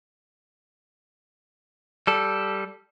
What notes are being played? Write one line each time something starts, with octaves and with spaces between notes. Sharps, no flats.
G3 A4